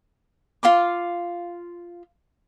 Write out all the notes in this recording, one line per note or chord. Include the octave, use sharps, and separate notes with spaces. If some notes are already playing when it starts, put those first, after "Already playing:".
F4 F5 C6 D6